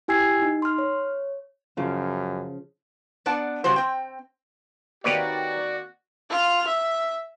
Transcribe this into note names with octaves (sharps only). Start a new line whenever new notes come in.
E4 G4 G#5 E6 G#6 C7
D#4
C6 F6
C#5
F#2 C#3 F3
B3 D4 D5 F#5 A5
C#3 G3 F#4 C5
C4 G5
D#3 A#3 C4 F#4 G4 B4 C#5 D5
F4 F6
E5